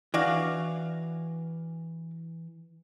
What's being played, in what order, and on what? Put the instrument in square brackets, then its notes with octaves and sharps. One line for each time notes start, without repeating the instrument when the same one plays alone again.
[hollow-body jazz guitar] E3 [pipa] D4 F#4 F5